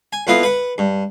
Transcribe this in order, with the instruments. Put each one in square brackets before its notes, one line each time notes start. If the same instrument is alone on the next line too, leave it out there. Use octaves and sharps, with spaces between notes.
[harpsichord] G#5
F2 B3 E4 F4 D#5 F5
B4 F#5
G2